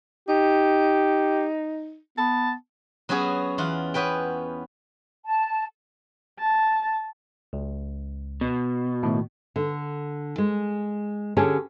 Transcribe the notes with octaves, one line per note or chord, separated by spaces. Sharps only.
D#4 G4
B3 A5
F#3 B3 C#4 F#4 G#4
E2 F4 F#5
B3 C#4 B4 G5
A5
A5
C#2
B2
A2 D#3 A3
D3
G#3
D3 C#4 G4 G#4 C#5 A5